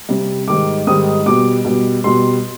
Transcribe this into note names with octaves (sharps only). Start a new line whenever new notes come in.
C3 G3
G#2 D#3 G3 D6
G#2 D#3 G3 D#6
B2 G3 D6
B2 G3
B2 G3 C6